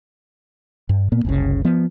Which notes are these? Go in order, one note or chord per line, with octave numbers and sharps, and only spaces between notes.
G2
A#2 A#3 B3
F#1 C2 C#3
F3 B3